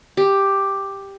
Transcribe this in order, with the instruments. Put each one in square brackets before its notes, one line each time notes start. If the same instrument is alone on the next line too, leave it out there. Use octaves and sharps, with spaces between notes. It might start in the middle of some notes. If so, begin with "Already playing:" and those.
[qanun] G4